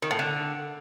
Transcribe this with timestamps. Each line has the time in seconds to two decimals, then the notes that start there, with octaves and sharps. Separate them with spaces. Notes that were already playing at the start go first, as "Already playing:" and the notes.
0.02 D#3
0.11 A2
0.19 D3